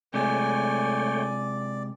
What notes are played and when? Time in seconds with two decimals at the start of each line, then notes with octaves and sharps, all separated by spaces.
0.14 C3 G#3 A3 C#5 D5 G5 G#5